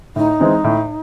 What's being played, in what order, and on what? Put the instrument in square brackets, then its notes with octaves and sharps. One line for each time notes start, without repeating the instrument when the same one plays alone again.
[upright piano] A2 [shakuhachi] D#4
[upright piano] E3 G#3 C4
A2